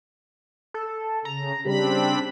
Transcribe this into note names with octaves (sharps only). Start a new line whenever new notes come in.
A4
C#3 A#5
C#3 G3 C4 D4 G4 B5